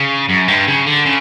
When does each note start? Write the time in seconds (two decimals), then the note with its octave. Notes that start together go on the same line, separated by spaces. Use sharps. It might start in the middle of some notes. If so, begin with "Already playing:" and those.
Already playing: C#3
0.29 F#2
0.48 G2
0.67 C#3
0.86 D3
1.05 C#3